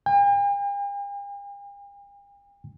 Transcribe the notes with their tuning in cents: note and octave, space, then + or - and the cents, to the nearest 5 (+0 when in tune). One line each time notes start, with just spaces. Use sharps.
G5 +45